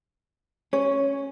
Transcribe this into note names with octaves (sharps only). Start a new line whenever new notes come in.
C#4 C#5